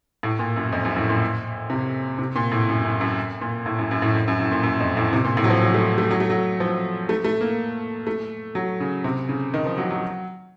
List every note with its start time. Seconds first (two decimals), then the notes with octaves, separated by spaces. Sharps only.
0.23 A2
0.39 A#2
0.56 F#2
0.72 F2
0.85 F#2
0.96 A2
1.09 A#2
1.70 C3
2.19 C3
2.36 A#2
2.52 A2
2.69 F#2
2.85 F#2
3.01 F#2
3.41 A#2
3.66 A2
3.78 F#2
3.91 F#2
4.02 A2
4.15 F2
4.28 F#2
4.40 A2
4.51 A#2
4.63 F#2
4.80 F2
4.97 A2
5.13 C3
5.25 A#2
5.37 A2
5.44 F#3
5.50 F3
5.62 F#3
5.74 A3
5.98 A3
6.11 F#3
6.20 A3
6.30 F#3
6.60 F3
7.09 A3
7.25 A3
7.41 A#3
8.07 A3
8.55 F#3
8.80 C#3
9.04 C3
9.29 C#3
9.54 D#3
9.66 F3
9.78 F#3
9.91 F#3